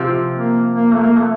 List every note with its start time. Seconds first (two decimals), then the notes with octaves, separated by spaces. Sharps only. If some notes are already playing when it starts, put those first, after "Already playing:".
Already playing: C3 F3 C4
0.33 A#3
0.73 A#3
0.93 A3
1.00 A#3
1.17 A3